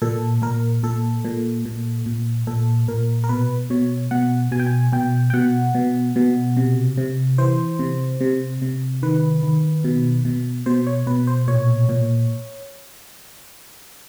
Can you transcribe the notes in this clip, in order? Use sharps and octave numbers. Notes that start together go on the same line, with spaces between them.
A#2 A4
A#2 A#4
A#2 A4
A#2
A#2
A#2
A#2 A4
A#2 A#4
A#4
B2 B4
B2 C#5
B2 F#5
B2 G#5
G5
G#5
B2 G5
G5
B2 F#5
B2
B2
C3
C3
E3 C5
C3
C3
C3
D#3 B4
D#3
B2
B2
B2 C5
C#5
B2 B4
C5
A#2 C#5
A#2